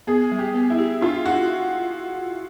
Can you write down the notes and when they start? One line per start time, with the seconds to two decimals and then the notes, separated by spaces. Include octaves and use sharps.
0.07 B3 G#4
0.32 G3
0.39 G4
0.54 B3
0.70 E4
0.79 G4
1.01 D4 F4
1.26 D4 F#4